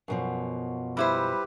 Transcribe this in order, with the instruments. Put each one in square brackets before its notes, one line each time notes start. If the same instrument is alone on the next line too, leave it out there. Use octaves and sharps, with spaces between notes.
[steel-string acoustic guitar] F#2 B2 F3
[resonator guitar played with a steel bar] G3 E4 C5 [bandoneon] G4 B4